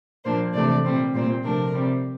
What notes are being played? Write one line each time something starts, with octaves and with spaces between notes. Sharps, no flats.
A#2 F3 A#3 D4 C5
C3 E3 A3 D4 D5
A#2 G3 C4
A#2 G3 C4 C5
C3 F3 A3 D4 A#4
C3 G3 C4